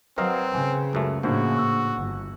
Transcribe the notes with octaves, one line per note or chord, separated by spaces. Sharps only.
F#3 C4 A#4 B4 D#5 F5
C#3 B4 G#5
C#2 F#2 A3
A2 C#3 F3 A3 A#3 D4 F#4
A2 C#6 E6 F#6
G1